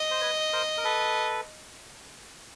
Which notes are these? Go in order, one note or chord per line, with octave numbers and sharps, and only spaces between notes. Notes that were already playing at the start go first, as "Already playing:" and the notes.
Already playing: D#5
C5
B4 C#5
A#4 C5
A#4
A4 B4